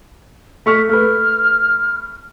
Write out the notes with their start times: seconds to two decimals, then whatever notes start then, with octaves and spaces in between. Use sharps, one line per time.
0.66 A3 C#6 F6 B6
0.89 A3 B4 F6